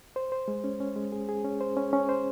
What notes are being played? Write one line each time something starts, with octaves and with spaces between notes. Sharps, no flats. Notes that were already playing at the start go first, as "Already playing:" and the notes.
C5
C5
G#3
C#4
C#4
G#3
G#4
G#4
C#4
C5
C#4
C#4
C5